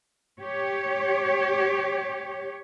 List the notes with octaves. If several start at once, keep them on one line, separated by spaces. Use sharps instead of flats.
G4 C#5